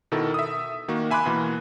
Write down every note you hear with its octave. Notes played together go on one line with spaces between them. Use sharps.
B2 D#3 E4 A4 A#4
E5 D#6
D#3 A#3 F#4
E5 G#5 B5 C6 D6 F#6
B2 E3 A#3